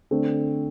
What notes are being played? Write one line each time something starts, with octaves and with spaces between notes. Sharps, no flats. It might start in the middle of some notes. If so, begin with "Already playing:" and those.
D3 A3 C4